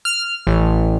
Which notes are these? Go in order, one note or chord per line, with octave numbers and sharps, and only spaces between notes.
F6
A1